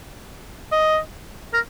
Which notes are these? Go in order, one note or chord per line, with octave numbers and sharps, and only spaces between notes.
D#5
A#4